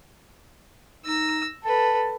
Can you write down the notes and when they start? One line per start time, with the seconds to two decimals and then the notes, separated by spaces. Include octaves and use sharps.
1.06 D#4 E6 A#6
1.64 A4 B4 A5